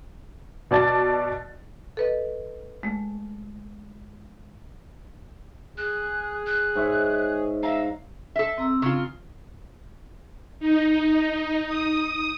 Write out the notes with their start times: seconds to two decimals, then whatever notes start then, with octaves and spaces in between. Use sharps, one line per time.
0.71 B2 D5 A5 A6
1.97 A4 B4 D#5
2.83 G#3 A3
5.77 G#4 F#6
6.47 F#6
6.75 G#2 C#5 E5
7.63 E5 F5 A#5
8.36 A4 E5
8.58 C4 A#5 E6
8.82 C#3 F4
10.60 D#4
11.66 D#6